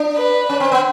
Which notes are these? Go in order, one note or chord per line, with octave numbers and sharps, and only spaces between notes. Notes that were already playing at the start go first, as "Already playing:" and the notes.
Already playing: D4
B4
C#4
C4
B3